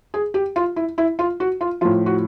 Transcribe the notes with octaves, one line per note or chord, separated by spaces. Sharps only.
G#4
G4
F4
E4
E4
F4
F#4
F4
A2 F3 F4
F#4